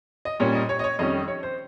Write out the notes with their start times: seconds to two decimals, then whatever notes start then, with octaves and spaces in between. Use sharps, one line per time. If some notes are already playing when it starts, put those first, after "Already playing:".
0.25 D#5
0.40 A#2 G3 A#3 C#4 C#5
0.55 D#5
0.69 C#5
0.79 D#5
0.84 C#5
0.99 F2 D#3 G3 C#4 D#5
1.28 C#5
1.43 C5